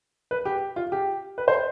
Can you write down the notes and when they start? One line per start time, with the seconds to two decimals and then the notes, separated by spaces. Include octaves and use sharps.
0.31 B4
0.45 G4
0.76 F4
0.92 G4
1.38 B4
1.48 C5